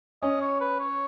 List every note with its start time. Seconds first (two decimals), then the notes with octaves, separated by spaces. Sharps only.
0.22 C#4 D#5
0.41 C#5
0.61 B4
0.80 C#5